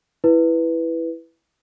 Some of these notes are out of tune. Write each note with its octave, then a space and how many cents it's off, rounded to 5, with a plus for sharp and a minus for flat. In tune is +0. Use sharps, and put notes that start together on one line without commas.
E4 +5 B4 +0